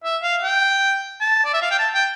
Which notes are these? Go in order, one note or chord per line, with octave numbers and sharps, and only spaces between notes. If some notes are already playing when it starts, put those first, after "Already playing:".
E5
F5
G5
A5
D5
E5
F5
G5
A5
G5